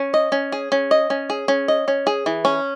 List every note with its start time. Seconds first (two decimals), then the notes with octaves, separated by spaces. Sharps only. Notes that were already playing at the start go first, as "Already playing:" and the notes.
Already playing: C#4
0.14 D#5
0.32 C#4
0.52 G#4
0.72 C#4
0.91 D#5
1.10 C#4
1.30 G#4
1.48 C#4
1.68 D#5
1.88 C#4
2.07 G#4
2.26 E3
2.45 C#4